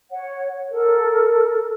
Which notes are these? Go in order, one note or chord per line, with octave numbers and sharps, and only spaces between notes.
C#5 F#5
A4 A#4